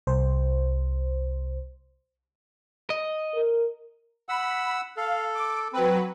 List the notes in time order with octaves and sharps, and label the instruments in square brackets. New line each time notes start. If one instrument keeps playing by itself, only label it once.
[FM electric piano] C2 C5
[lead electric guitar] D#5
[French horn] A#4
[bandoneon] F#5 E6 [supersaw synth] B5
[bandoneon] A4 [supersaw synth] F5
[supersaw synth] D6
[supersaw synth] F#3 B4 [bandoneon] C4